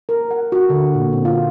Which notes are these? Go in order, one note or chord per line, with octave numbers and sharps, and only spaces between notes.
A#4
F#5
F#4
D3
A#2
C4
F4